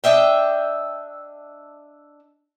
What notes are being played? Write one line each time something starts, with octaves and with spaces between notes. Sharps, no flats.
D4 D#5 E5 G5